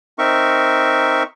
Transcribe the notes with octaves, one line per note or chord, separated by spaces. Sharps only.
C4 D#4 A#4 E5 C#6